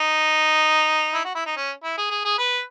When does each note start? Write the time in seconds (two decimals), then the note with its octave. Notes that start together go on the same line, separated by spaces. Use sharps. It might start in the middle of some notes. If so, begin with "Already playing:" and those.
Already playing: D#4
1.14 E4
1.25 F#4
1.35 E4
1.46 D#4
1.57 C#4
1.84 E4
1.98 G#4
2.11 G#4
2.25 G#4
2.39 B4